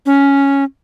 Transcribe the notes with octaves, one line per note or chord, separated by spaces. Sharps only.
C#4